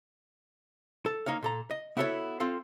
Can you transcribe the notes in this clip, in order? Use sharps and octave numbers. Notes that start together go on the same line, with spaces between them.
A4
A#3 D#4 C#5 F5
A#2 A4 A#5
D#5
B3 E4 F#4 A4 A#4 C#5
C4 F4 A4 F5